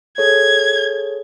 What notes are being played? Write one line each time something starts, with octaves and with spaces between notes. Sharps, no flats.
G#4 A4 C#5 G#6